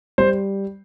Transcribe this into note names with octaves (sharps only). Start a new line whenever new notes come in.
G3 C5